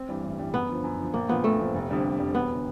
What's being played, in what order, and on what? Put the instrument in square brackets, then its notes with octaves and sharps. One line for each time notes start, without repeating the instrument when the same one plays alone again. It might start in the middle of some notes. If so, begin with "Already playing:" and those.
Already playing: [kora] C4
[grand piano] G2 E3 G3
A1
G2 E3 G3
[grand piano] F#2 [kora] B3
[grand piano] D3 F3
F#2
D3 F3
[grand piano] A#1 [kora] A#3
[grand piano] A#2 F3 [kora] B3
[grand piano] A#1 [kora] A3
[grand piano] A#2 F3
F1
F2 D3 G3
F1
F2 D3 G3
[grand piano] E1 [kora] B3
[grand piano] D3